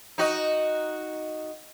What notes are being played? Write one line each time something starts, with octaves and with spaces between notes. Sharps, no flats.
D#4 F#4 D#5